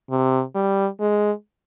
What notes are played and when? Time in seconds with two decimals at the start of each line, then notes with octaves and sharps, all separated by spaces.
0.11 C3
0.55 G3
1.00 G#3